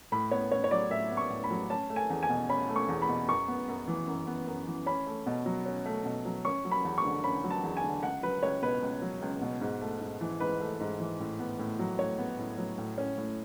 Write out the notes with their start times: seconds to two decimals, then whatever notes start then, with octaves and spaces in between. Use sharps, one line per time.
0.12 A2 B5
0.31 B3 C#5
0.51 A2 C#5
0.64 C#5
0.71 F#3 D5
0.91 A2 E5
1.11 B3
1.17 C#6
1.30 A2
1.44 B5
1.51 F#3
1.70 C#4 A5
1.90 A3
1.96 G#5
2.10 E2
2.23 G#5
2.29 B2
2.49 C#4 B5
2.69 A3
2.76 C#6
2.89 E2
3.02 B5
3.09 B2
3.28 F#2 C#6
3.48 B3
3.68 F#2
3.88 E3
4.07 F#2
4.27 B3
4.47 F#2
4.67 E3
4.86 C#4 B5
5.07 A3
5.26 B2
5.46 F#3
5.66 C#4
5.86 A3
6.05 B2
6.25 F#3
6.45 C#4 C#6
6.65 F#3
6.71 B5
6.84 E2
6.98 C#6
7.04 D3
7.24 C#4 B5
7.44 F#3
7.50 A5
7.63 E2
7.77 G#5
7.84 D3
8.03 C#2 F#5
8.23 F#3 B4
8.43 C#2 C#5
8.62 B2 B4
8.82 C#2
9.02 F#3
9.22 C#2
9.41 B2
9.61 G#2
9.81 A3
10.01 G#2
10.21 E3
10.40 G#2 B4
10.60 A3
10.80 G#2
11.00 E3
11.20 A2
11.39 B3
11.59 A2
11.79 F#3
11.99 A2 C#5
12.18 B3
12.39 A2
12.58 F#3
12.78 A2
12.98 C#4
13.18 A2